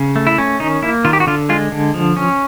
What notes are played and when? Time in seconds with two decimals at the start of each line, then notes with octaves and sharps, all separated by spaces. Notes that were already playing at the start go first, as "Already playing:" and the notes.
Already playing: C#3
0.16 A3
0.27 E4
0.38 C#4
0.60 D#3 D#4
0.83 A#3 E4
1.05 D#3 F4
1.13 G4
1.20 F#4
1.27 D3 F4
1.49 G#3 F4
1.72 D3
1.94 F3
2.17 C#4